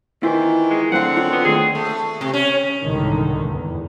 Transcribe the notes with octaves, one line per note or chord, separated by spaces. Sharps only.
D#3 E3 E4 F4 C5
G#3
F#2 D3 A3 C4 F5 F#5
F4 C#5
B3
D#2 A3 G#4
A3
C3
C#4
C2 G#2 D3 D#3
E2